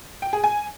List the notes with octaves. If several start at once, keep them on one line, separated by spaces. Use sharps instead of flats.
G5
G#4
G#5